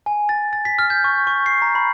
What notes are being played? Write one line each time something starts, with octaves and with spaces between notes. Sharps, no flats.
G#5
A6
A6
B6
F6
G6
C#6
C#6
C7
A#5
B5